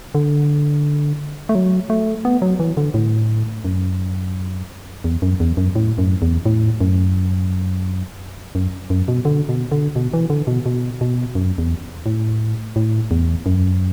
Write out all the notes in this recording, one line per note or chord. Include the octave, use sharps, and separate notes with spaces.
D3
A3
F#3
A3
B3
F#3
E3
D3
A2
F#2
E2
F#2
E2
F#2
A2
F#2
E2
A2
F#2
F#2
F#2
B2
D3
B2
D3
B2
E3
D3
B2
B2
B2
F#2
E2
A2
A2
E2
F#2